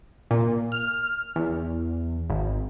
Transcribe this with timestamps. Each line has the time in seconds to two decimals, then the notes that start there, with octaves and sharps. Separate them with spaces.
0.31 A#2
0.72 F6
1.36 E2
2.30 G#1